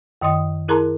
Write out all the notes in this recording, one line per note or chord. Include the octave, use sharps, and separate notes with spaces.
F#2 D#3 D#5 C6 D#6
E4 G#4 A#4 A5 A#5 C6